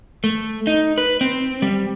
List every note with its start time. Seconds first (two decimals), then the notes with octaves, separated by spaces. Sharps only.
0.24 A3
0.67 D#4
0.98 B4
1.21 C4
1.62 G3